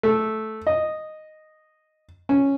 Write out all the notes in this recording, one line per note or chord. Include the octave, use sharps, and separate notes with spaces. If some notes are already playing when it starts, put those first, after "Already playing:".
A3
D#5
C#4